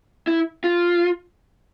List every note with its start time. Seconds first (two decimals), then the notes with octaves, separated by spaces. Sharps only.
0.27 E4
0.64 F4